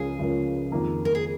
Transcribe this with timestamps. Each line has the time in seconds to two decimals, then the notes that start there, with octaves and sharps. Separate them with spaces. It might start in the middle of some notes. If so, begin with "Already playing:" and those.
Already playing: C#2 C#3 F3 C#4 G#4 A#4
0.19 C#2 C#3 F3 C#4 A#4
0.72 F2 D#3 A#3
1.05 A#4
1.15 G#4